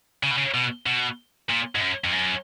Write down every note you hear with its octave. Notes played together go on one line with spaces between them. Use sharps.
C#3
B2
C#3
B2
B2
A#2
G#2
F#2
F2
F#2